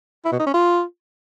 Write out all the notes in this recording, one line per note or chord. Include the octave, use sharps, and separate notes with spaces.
E4
B2
D#4
C#4
F4